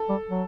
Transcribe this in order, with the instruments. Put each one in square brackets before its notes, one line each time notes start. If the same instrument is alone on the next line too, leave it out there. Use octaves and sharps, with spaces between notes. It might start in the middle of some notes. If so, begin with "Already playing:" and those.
Already playing: [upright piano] A4
[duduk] G3
F#3